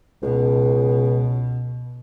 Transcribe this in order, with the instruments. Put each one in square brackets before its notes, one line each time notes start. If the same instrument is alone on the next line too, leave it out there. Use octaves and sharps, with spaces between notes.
[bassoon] C#2 [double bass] B2